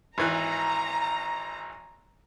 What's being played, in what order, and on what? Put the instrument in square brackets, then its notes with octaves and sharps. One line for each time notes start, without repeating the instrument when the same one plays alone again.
[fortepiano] G#1 E3 F#6 [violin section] A#5